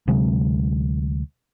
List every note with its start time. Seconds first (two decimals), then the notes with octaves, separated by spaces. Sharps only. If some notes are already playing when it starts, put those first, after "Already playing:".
0.07 D2 C3 F#3 G#3